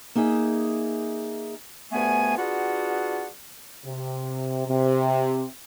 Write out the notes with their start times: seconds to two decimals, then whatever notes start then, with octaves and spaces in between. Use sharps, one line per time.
0.15 A#3 D#4 G#4 E5
1.92 D2 G2 A3 B3 G#5
2.37 B3 D4 F4 F#4 G#4 F#5
3.85 C3
4.67 C3